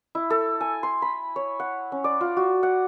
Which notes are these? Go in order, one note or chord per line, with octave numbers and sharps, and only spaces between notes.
E4
A4
G#5
C6
B5
C#5
F#5
C#4
D5
F4
F#4
F#5